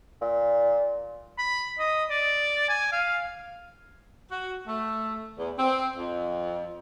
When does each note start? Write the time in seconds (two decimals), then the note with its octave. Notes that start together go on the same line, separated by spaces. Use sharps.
0.21 A#2
1.38 B5
1.79 D#5
2.10 D5
2.69 G#5
2.92 F5
4.31 F#4
4.68 A3
5.38 E2
5.59 C4
5.97 F2